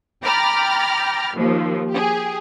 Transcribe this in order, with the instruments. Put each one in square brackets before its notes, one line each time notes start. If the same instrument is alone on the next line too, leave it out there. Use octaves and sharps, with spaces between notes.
[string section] G5 A#5 B5 D6 F6 A6
D#2 F3
G4 G#4